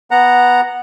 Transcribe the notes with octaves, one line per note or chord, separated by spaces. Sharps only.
B3 F#5 A#5